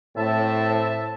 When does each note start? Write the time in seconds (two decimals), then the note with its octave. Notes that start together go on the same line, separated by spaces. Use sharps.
0.16 A2 C4 E5 A5